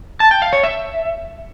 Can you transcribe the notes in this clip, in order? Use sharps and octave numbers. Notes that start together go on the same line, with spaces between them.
A5
G5
F5
C#5
E5